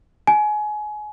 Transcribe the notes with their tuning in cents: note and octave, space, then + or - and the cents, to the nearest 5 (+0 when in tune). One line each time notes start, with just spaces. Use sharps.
G#5 +25